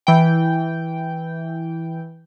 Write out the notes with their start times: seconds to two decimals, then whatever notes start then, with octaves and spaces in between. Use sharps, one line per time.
0.07 E3 G5